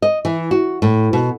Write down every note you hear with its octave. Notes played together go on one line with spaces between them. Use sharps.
D#5
E3
F#4
A2
B2